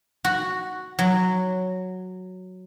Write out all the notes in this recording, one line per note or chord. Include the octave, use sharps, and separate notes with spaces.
F#4
F#3